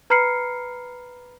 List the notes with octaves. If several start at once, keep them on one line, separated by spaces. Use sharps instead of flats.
B4 A#5 B5 F6 C7 C#7